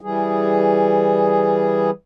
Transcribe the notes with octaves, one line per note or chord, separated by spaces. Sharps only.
E3 G3 G#4